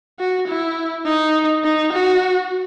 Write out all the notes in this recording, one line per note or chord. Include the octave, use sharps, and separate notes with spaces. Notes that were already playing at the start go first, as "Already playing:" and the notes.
F#4
E4
D#4
D#4
F#4